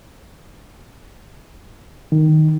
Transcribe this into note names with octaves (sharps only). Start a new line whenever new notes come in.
D#3